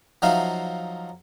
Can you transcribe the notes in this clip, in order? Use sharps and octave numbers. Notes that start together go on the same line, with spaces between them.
F3 F#3 D#4 E5 F5